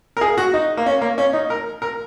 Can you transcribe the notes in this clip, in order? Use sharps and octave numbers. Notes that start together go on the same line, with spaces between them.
A#4
G#4
F#4
D#4
A#3
C#4
A#3
C#4
D#4
A#4
A#4